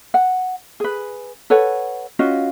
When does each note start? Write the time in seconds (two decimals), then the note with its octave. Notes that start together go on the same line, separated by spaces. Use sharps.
0.14 F#5
0.80 G#4 B4
1.50 A4 B4 C#5 F#5
2.19 C#4 F4 F#4 D#5